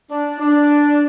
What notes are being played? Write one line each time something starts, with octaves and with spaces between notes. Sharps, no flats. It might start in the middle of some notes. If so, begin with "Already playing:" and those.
D4
D4